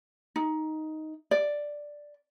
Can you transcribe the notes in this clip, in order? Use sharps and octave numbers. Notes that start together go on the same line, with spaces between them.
D#4
D5